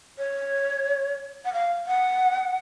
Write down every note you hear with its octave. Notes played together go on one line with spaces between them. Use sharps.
C#5
F#5
F5
F#5